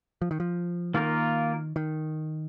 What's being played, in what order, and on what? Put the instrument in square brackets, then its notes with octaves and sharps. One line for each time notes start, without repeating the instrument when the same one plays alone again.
[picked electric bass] F3
D#3
F3
[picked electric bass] D#3 [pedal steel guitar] A#3 F4 A#4
[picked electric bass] D#3